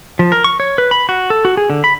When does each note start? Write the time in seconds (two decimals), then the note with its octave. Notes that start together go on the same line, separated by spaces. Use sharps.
0.19 F3
0.32 A#4
0.44 C#6
0.60 C#5
0.78 B4
0.91 B5
1.09 F#4
1.30 A4
1.45 F#4
1.57 G#4
1.70 D3
1.84 B5